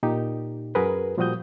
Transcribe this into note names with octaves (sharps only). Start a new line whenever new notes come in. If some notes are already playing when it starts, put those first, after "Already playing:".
A#2 D#4 G4
F#2 F#4 G#4 A#4 B4
A#2 F3 G3 F#4 D#6 G6